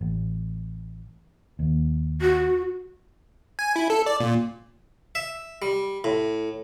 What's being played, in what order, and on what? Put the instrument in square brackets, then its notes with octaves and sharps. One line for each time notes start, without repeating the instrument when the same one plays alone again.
[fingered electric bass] A1
D#2
[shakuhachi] F#4
[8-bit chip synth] G#5
E4
A4
D5
A#2
[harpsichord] E5
G3
A2